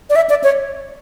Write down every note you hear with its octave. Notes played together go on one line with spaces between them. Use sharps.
D5
E5
D5
C#5